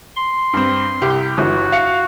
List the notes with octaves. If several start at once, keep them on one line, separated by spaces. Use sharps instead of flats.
C6
G2 C4
C2 G4
G1 E3 F#4
F5 C#7